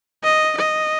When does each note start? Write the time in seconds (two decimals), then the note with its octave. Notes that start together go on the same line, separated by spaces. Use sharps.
0.24 D#5
0.58 D#5